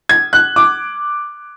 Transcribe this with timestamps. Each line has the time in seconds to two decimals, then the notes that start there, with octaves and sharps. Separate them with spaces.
0.09 G#6
0.33 F#6
0.56 D6